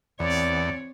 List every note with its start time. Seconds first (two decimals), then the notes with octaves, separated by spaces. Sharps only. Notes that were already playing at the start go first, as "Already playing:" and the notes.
0.20 E2 C4 C#5 D5